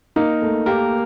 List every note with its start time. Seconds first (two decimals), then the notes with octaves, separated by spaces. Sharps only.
0.16 A#3 D#4 A#4
0.42 A3
0.66 A#3 G4 A#4